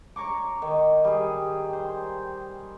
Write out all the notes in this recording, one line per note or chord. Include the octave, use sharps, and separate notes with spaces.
C#5 A#5 C#6 D6
D#3
G3 G#4
C5